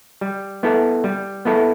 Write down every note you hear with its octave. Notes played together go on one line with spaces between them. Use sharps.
G3
B3 E4 A4
G3
B3 E4 A4